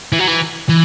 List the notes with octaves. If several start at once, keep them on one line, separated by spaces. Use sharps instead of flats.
E3
F#3
E3
E3